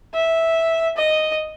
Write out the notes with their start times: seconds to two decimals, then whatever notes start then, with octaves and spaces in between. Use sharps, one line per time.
0.14 E5
0.97 D#5